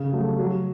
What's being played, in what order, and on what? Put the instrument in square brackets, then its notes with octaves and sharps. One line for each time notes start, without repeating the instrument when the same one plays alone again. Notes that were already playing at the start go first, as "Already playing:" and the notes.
Already playing: [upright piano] C#3
F#3 A3
F#3